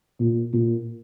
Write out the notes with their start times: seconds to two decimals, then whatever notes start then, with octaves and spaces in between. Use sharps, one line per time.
0.20 A#2
0.53 A#2